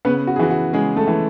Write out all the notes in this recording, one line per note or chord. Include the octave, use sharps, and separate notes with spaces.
C#3 B3 B4
F#4
G#4
E3 F#4
F#4
C#3 G#3 G#4
A3 A4
E3